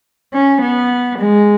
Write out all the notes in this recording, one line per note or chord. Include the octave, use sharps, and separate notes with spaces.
C#4
B3
G#3